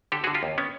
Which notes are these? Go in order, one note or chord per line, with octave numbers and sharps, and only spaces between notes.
D3 G4 A4
F#4 G#4
D3
F4 G4
D#2
B3 C#4